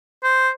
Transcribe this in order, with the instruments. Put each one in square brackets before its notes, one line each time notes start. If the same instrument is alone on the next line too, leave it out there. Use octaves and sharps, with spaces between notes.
[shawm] C5